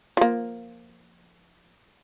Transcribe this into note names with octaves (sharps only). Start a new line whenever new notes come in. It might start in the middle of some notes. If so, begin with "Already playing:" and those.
F3 A#3